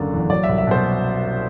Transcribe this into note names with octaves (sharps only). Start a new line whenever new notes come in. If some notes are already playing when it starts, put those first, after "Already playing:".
Already playing: F#1 F#2 D3 D5
E2
F#3 D5
E5
C2
E5
B2 C5